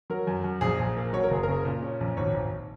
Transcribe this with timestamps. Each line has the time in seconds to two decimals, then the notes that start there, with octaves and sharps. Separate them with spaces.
0.10 F#3 A#4
0.27 F#2
0.44 F#2
0.61 A#1 G#4
0.79 A#1
0.97 A#3
1.13 F#3 C#5
1.23 A#4
1.30 F#1 G#4
1.43 A#4
1.49 C#3
1.65 A#2
1.82 C#4
2.00 A#1
2.17 G#1 C#5
2.34 G#1